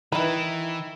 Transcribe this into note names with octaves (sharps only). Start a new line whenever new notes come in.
D#3 E3 E4 B4